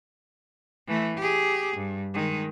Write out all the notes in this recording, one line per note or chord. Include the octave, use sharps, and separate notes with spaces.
E3 A3
G4 G#4
G2
D#3 G#3